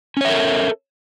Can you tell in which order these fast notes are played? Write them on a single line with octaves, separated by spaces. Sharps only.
C#4 C#5 E5 A#4 A4